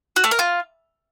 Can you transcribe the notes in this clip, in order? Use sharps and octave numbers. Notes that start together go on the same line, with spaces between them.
F#4
A3
A#4
F4